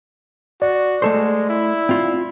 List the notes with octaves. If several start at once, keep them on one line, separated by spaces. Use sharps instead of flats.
F#4 D5
G#3 A3 A4 C5
E4
C4 F4